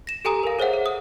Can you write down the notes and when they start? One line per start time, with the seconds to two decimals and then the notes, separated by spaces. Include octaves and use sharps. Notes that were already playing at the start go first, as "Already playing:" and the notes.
0.07 A#6 E7
0.25 G4 A4 G#5 A#5 D#6
0.43 A#4 F5
0.59 G#4 C5 C#5 E5 F#5
0.73 G#4
0.86 D#6